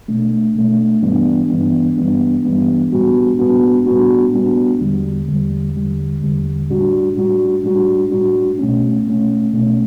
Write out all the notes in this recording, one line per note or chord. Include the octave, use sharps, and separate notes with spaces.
B2 A3 D4
B2 A3 D4
G2 E3 G3 B3 D4
G2 E3 G3 B3 D4
G2 E3 G3 B3 D4
G2 E3 G3 B3 D4
A2 G3 B3 D4 F#4
A2 G3 B3 D4 F#4
A2 G3 B3 D4 F#4
A2 G3 B3 D4 F#4
E2 D3 G3
E2 D3 G3
E2 D3 G3
E2 D3 G3
A2 G3 D4 F#4
A2 G3 D4 F#4
A2 G3 D4 F#4
A2 G3 D4 F#4
B2 A3 C#4
B2 A3 C#4
B2 A3 C#4